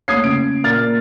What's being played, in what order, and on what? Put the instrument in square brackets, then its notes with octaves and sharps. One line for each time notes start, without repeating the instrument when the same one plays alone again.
[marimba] A3 A#3 C#5 [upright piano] D#6 G#6 C7
[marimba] C#3 C#4 [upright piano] D7
[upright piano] A#2 F6 A6